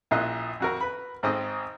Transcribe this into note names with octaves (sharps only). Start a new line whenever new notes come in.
A#1 A#2 E4 D#5 F#6
F2 F#4 A#4
B4 B5
G#1 G#2 C4 C5 D#5